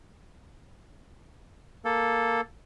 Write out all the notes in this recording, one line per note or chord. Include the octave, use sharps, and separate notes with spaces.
A#3 A4